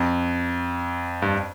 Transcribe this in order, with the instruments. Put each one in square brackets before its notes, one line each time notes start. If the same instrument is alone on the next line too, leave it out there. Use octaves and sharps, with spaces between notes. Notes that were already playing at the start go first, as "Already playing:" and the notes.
Already playing: [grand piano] F2
G2